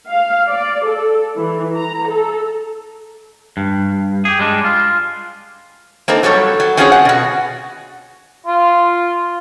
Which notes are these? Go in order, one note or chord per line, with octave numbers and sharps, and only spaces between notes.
F5
D5
A4
E3
A#5
A4
G2
G4 G#4
G3 G#3 D4
F4
A#3 C4 D#4 A4
F#3 G3 A4 C#5
F#3
C4 C#4 F4 F#4 G#4 C#5
F#5
B2 F#4
F4